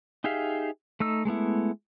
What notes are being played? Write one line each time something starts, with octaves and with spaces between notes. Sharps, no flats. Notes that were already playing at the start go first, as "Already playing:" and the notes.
D#4 G4 G#4 E5 F5
A3 D#4 E6
G#3 A3 B3 E4